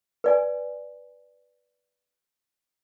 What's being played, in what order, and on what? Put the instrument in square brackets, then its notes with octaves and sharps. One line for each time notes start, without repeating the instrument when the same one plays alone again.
[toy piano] B4 D5 G#5